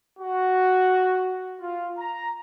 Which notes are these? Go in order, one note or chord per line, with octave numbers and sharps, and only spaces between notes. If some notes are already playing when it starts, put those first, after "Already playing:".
F#4
F4
A#5